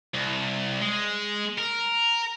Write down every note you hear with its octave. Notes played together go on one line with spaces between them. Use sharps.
C2
G#3
A#4